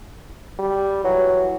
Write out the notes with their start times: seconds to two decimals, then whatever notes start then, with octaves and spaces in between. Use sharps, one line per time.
0.59 G3
1.04 E3 F#3